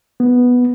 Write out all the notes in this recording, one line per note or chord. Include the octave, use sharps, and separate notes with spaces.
B3